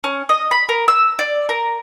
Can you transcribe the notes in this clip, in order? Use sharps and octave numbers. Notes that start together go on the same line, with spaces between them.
C#4
D#5
B5
A#4
E6
D5
A#4